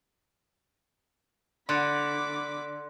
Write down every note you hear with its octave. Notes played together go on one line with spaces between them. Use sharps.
D3 B5 C6 D6 F#6 C#7